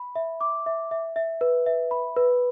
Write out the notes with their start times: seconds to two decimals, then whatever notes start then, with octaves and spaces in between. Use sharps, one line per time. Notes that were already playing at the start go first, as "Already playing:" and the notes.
Already playing: B5
0.16 E5
0.41 D6
0.66 E5
0.91 E5
1.16 E5
1.41 B4
1.66 E5
1.91 B5
2.16 B4